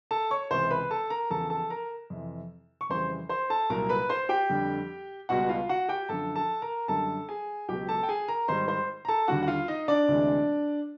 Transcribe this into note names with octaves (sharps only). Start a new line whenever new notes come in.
A4 A5
C#5 C#6
C#2 C3 E3 C5 C6
B4 B5
A4 A5
A#4 A#5
E2 C#3 F3 A4 A5
A4 A5
A#4 A#5
F2 C3 E3
C#6
F2 C#3 E3 G3 C5 C6
C5 C6
A4 A5
C2 A#2 F#3 A#4 A#5
B4 B5
C5 C6
G4 G5
F2 D3 G3
C#2 B2 G3 F#4 F#5
F4 F5
F#4 F#5
G4 G5
F#2 D3 F3 A4 A5
A4 A5
A#4 A#5
F#2 D3 G3 A4 A5
G#4 G#5
C#2 B2 F#3 G4 G5
A4 A5
G5
G#4 G#5
A#4 A#5
G#2 D#3 G3 C5 C6
C5 C6
A#5
A4 A5
D#2 D3 G3 F#4 F#5
F#5
F4 F5
D#4 D#5
D4 D5
D2 C3 E3 G#3